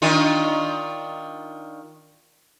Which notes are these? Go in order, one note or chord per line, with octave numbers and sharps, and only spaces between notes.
D#3 D4 F4